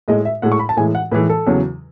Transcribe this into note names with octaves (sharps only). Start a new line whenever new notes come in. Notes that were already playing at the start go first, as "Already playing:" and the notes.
A2 G#3 D#5
E5
A2 G#3 F#5
C#6
B5
A5
A2 E3 G#3 G#5
F#5
A2 E3 G#3 B4
A4
E2 C#3 F#3